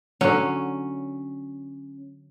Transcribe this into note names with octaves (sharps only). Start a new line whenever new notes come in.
D3 F#3 C#4